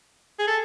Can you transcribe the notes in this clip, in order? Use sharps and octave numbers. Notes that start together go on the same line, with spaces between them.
G#4
A4